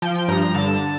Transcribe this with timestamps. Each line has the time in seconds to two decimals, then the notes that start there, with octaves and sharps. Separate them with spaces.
0.02 F3 G5
0.15 G5
0.28 G2 A#5
0.42 A#5
0.54 D3 A5